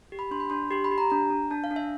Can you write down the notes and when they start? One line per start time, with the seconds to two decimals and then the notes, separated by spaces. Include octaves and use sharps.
0.12 G4
0.19 B5
0.31 D4 C6
0.40 B5
0.50 D4 C6
0.71 G4 C6
0.84 B5
0.92 G4
0.98 A#5
1.10 D4 A#5
1.30 D4
1.51 D4 A5
1.64 F5
1.71 D4
1.76 E5